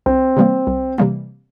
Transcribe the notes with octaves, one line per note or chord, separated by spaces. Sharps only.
C2 C4
C3 E3 G3 A#3
C2
C3 E3 G3 A#3